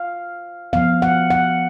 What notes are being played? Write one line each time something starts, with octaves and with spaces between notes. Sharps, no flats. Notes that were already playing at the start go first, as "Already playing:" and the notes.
Already playing: F5
F3 B3 F5
F#5
F#5